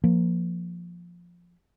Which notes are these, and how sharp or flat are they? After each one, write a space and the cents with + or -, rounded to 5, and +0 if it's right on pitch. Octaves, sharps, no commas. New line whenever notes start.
F3 +0 A#3 +0